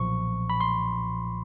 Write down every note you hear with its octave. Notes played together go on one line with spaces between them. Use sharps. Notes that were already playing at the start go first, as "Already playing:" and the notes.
Already playing: B1 A#2 F3 C#6
B5
C6